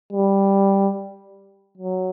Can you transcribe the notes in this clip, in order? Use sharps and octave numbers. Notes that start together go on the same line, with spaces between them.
G3
F#3